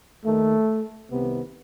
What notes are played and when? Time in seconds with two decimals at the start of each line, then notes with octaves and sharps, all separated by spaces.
0.25 D#2 D#3 A3
1.11 C2 C3 D#3 B3